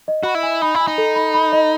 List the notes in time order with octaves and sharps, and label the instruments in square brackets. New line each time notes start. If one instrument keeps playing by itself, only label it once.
[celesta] D#5
[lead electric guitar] F#4 [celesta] B5
[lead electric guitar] E4
[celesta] G#5
[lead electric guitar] D#4 [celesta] B5
[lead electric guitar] E4
[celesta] G#5
[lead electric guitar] D#4
[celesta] A4
B5
B5
D#5